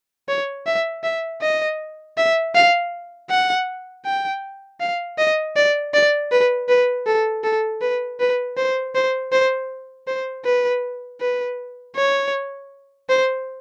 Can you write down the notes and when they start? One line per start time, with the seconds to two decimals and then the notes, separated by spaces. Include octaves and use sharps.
0.29 C#5
0.66 E5
1.03 E5
1.42 D#5
2.18 E5
2.55 F5
3.30 F#5
4.05 G5
4.80 F5
5.18 D#5
5.56 D5
5.94 D5
6.32 B4
6.69 B4
7.07 A4
7.44 A4
7.81 B4
8.20 B4
8.57 C5
8.95 C5
9.32 C5
10.07 C5
10.45 B4
11.21 B4
11.96 C#5
13.10 C5